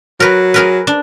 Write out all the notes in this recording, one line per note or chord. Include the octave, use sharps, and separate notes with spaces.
F#3 A#4 B4
G#4 A#4 B4
D4